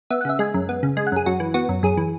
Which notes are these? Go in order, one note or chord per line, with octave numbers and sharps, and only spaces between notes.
B3 E5
F#5
C#3 E5
G#3 G#5
F#2
B3
C#3
G#3 G#5
F#5
F#2 G#4
F#2 F#4
E3
B3 F#4
F#2
F#2 G#4
E3